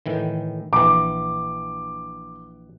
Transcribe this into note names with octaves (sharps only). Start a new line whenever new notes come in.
A2 D#3 E3
A#1 E3 D6